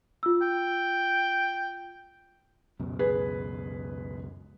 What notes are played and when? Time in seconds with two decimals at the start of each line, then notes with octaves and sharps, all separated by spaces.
0.23 F4 E6
0.42 G5
2.80 C#2 F#2 B2
2.99 G#4 B4